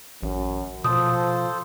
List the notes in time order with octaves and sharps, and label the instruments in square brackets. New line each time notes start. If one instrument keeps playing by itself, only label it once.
[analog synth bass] A1 [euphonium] F#2
[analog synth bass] B2 [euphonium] F3 [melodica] A4 C5 [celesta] D#6